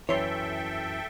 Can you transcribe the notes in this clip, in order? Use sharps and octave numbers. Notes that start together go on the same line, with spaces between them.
F#2 E3 A4 C#5 E5 G5 C6